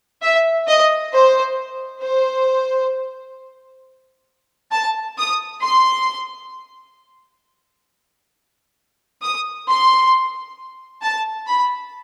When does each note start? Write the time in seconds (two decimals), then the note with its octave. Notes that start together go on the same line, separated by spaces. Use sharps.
0.22 E5
0.67 D#5
1.13 C5
2.02 C5
4.73 A5
5.18 D#6
5.62 C6
9.22 D#6
9.67 C6
11.02 A5
11.47 B5